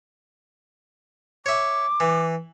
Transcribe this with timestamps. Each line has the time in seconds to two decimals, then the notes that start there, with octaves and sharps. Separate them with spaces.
1.46 C#5 E5 D6
2.00 E3